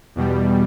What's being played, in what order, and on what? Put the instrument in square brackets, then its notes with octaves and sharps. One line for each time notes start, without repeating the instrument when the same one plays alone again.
[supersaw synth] E2 B2 G3